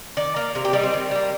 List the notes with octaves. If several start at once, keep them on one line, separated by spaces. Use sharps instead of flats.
D#3 D5
A#3
C3 A#4
G4
G3 A#3 D#4
C4
D#3
G3 A#3